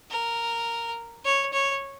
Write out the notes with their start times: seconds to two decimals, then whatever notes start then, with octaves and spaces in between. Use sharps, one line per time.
0.10 A#4
1.25 C#5
1.53 C#5